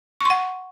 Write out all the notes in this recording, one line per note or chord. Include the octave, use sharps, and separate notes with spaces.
F#5 C6 C#6